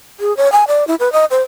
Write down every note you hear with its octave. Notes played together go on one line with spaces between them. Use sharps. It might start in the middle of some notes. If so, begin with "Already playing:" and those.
G#4
C#5
G#5
D5
E4
B4
D#5
C5